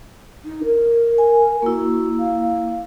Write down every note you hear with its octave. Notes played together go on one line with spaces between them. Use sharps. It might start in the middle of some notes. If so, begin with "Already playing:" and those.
D#4
A#4
G#5
A#3 E4 F#4
F5